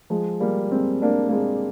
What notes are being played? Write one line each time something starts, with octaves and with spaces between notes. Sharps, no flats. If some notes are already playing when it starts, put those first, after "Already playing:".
F3 G#3
G3 A#3
G#3 C4
A#3 D4
A#3
G#3 C4